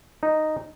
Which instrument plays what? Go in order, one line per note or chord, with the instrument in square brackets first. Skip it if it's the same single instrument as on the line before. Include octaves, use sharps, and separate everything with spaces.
[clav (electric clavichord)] D#4